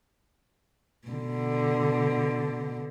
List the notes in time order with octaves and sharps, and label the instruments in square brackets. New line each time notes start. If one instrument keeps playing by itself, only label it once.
[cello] B2 D3